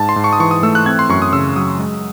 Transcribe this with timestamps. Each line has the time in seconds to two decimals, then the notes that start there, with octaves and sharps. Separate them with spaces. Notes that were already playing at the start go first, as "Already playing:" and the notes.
Already playing: G#2 A5
0.09 C6
0.16 G#2
0.24 C#6
0.33 D#6
0.40 E3 C#6
0.51 D#6
0.63 A3 E6
0.75 F#6
0.86 C4 G#6
0.99 C6
1.09 F#2 C#6
1.22 D#6
1.33 C#3 E6
1.56 F#3 D#6
1.79 G#3